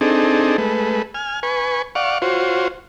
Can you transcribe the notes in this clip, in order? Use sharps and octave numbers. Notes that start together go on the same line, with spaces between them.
C4 D4 D#4 G#4 A4
G#3 A3 B4
G#5 F6
B4 G#5 C#6
D5 F5 F#5 C#6
F4 F#4 C5 C#5